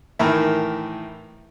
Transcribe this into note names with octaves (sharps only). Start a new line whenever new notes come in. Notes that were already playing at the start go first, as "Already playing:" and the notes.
A2 D#3 E3 A#4 E5